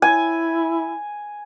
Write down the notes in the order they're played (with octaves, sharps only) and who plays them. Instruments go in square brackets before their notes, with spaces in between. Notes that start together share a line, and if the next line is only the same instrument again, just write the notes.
[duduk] E4 [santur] G#5